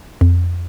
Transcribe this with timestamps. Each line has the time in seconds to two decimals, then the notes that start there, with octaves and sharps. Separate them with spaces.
0.21 F2